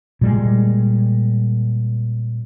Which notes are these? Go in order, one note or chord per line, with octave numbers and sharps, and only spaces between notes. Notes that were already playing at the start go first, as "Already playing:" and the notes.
A#2 G3 G#3